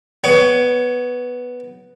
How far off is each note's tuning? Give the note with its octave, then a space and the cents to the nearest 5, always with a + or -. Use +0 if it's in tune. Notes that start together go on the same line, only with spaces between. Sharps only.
B3 +0 C#5 +20